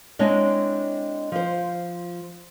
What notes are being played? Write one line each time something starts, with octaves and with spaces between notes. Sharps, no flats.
G#3 C4 D4 E4 C#5 D#5
F3 C5